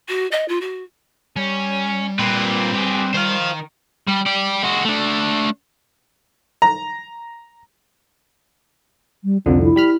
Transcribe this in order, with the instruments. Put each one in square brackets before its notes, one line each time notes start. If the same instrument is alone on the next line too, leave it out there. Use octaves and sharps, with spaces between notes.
[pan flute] F#4
D#5
F4
F#4
[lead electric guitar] G3 [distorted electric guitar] C#4
[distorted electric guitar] A#2 [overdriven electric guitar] C4 B4
[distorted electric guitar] G4 G#4
[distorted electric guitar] D#3 [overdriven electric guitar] C5 F5
[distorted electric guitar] G3
G4 D5
G#3 F#4
A3 D4
[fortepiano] A#5
[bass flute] G3
[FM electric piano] C2 F2 D3 [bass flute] C4
[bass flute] E4
[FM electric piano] G3 B5 F6